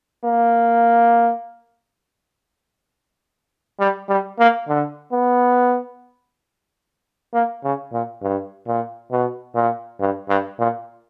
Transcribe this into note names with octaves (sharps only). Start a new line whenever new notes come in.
A#3
G3
G3
A#3
D3
B3
A#3
C#3
A#2
G2
A#2
B2
A#2
G2
G2
A#2